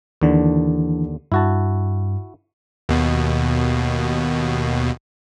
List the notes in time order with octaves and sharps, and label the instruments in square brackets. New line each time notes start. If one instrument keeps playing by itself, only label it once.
[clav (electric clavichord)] D#2 D3 [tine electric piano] E3 D4
[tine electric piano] G2 [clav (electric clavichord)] E4 F#4 A5
[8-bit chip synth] D#2 B2